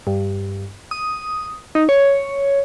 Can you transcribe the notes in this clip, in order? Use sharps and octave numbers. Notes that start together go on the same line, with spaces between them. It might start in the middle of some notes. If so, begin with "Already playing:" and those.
G2
D#6
D#4
C#5